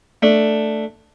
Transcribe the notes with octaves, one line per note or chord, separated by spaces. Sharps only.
A3 D4